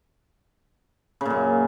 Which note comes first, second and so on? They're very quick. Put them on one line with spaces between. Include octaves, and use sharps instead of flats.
C#3 A#2 F#2